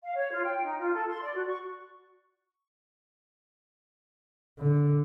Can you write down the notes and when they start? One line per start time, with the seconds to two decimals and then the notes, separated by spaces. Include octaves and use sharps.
0.03 F5
0.15 C#5
0.32 F4
0.45 G5
0.62 D#4
0.79 F4
0.93 A4
1.09 C6
1.21 D5
1.34 F#4
1.48 C#6
4.59 D3